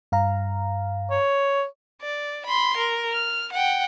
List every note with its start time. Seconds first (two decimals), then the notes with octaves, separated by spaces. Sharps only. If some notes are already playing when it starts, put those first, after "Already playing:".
0.12 G2 F5 A#5
1.10 C#5
2.02 D5
2.46 B5 C6
2.77 A#4
3.12 F6
3.53 F#5 G5